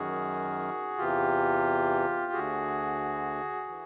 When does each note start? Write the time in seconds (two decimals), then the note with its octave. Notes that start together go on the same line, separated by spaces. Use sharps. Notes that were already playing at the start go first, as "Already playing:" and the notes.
Already playing: F#2 D#3 F#4 G#4
0.97 E2 C3 E3 F4 G4
2.32 D2 D3 F#4 G#4
3.68 E3